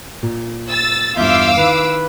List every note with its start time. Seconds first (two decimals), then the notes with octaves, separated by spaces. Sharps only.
0.23 A#2
0.70 E6 A6
1.17 E2 G2 F4 E5 F5 D6 E6 G6
1.57 D#3 E4 B4